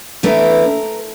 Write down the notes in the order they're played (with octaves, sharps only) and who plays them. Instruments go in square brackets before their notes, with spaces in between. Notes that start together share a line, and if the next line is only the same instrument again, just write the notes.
[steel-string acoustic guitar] E2 E3 A3 D4 A#4